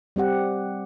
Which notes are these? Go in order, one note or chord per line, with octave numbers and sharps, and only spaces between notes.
G3 C4 G4 F#5